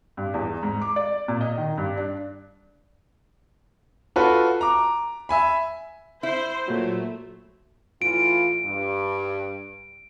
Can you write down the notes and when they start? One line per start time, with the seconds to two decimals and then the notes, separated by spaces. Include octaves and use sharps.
0.17 G2
0.34 E2
0.63 G#2
0.82 D6
0.96 D5
1.28 A#2
1.41 D#5
1.58 D#3
1.78 G2
1.97 D4
4.16 F4 F#4 A4 B4
4.61 A#5 D6
5.29 E5 G#5 B5
6.23 E4 C5
6.68 A#2 F#3 A3
8.02 A2 E3 F4 D7
8.66 G2